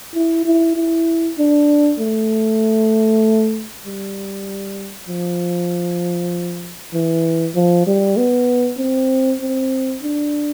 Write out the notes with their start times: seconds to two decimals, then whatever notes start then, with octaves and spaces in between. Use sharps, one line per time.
0.15 E4
0.45 E4
0.76 E4
1.39 D4
1.99 A3
3.86 G3
5.08 F3
6.93 E3
7.55 F3
7.87 G3
8.17 B3
8.79 C4
9.40 C4
10.03 D4